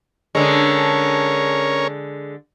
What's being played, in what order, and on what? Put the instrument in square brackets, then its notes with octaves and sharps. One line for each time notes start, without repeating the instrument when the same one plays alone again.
[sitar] D3 G#3 [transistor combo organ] C#4 A#4 C#5